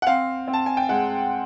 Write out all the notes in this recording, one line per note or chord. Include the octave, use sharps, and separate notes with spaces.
F#5
C4 F5
C4
A5
G#5
G5
G#3 F#5